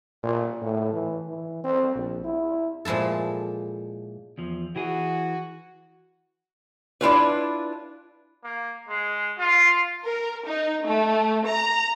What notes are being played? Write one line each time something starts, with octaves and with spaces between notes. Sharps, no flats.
A#2
A2
E3
E3
C4
A#1
E4
A#2 F3 G#3 E4 A4
E2 F3
E3 F#4 G#4
D4 E4 F4 B4
A#3
G#3
F4
A#4
D#4
A3
A#5